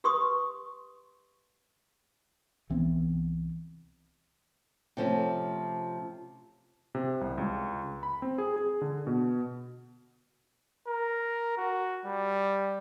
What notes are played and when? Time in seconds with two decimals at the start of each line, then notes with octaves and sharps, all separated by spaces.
0.04 G4 B4 C6 C#6 D#6
2.70 C2 E3 B3 C4
4.97 C3 F3 A3 C#4
6.95 C3
7.21 C2
7.38 C#2
8.03 B5
8.22 C4
8.38 G#4
8.56 G#4
8.81 D3
9.07 B2
10.88 A#4
11.57 F#4
12.06 G3